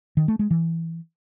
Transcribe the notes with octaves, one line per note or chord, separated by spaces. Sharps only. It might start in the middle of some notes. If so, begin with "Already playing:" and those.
D#3
A3
G#3
E3